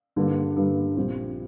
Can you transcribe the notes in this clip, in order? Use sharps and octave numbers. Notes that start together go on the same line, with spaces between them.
G2 D3 G3 A#3
G2 D3 G3 A#3
A#1 A#2 G3 C4